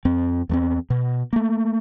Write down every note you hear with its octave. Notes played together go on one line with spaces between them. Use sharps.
F2 C4
E2 A3 C4
B2
A3 A#3